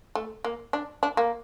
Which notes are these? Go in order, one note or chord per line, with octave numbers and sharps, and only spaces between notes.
A3
A#3
D4
D4
A#3